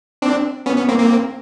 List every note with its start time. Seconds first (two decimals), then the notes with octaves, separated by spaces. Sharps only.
0.22 C4 D4
0.66 B3 C#4
0.77 B3 C#4
0.88 A#3 C4
0.99 A#3 C4